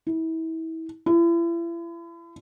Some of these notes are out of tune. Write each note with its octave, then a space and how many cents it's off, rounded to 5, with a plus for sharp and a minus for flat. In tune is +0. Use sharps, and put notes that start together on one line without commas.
E4 -30
E4 +40